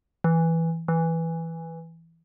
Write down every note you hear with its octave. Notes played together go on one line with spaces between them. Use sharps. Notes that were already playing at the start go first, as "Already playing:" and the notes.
E3
E3